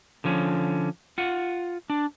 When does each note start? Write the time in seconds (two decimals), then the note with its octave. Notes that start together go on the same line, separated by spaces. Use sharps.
0.24 D3 F3 C#4
1.18 F4 F#5
1.90 D4